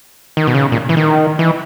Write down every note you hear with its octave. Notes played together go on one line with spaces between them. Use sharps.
D#3
B2
C#3
A#2
E3
D#3
E3